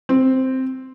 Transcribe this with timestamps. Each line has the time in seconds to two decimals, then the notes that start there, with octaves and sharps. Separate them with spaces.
0.09 C4